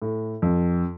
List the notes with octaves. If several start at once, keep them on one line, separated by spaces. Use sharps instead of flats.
A2
F2